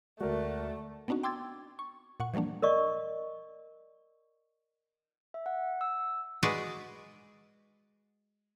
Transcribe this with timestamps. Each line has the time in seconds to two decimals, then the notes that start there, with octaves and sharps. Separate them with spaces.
0.20 D2 G#3 A3 F#4 A#4 D5
1.08 B3 C4 D4 D#4 F#4
1.23 G5 C6 D6 E6 G#6 A6
1.79 C#6
2.20 A#2 F#5 C#6
2.34 E3 F3 G3 A#3 D4
2.62 A#4 D5 D#5 C#6
5.34 E5
5.46 F#5
5.81 E6
6.43 G#3 F#4 G#4 B4 D5